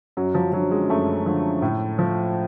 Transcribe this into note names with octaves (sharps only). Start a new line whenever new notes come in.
F#2 F#3
F3
D3 F3 F#3
G#3
F#2 A3
D3 F3
A2
F3